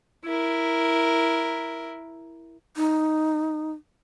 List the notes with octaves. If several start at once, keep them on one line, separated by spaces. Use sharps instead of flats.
E4 A#4
D#4